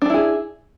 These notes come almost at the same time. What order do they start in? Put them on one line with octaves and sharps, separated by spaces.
D4 A4 E4 G#4